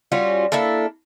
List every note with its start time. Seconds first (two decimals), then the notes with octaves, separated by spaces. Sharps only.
0.12 G3 C#4 F4 F#4
0.52 A#3 D4 E4 A4